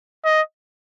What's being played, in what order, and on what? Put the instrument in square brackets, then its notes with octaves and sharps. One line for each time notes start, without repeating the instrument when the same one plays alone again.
[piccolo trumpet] D#5